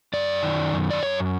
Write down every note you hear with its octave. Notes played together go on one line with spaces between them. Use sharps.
F#2 D5
D#3
F#2
D5
F#2 C#5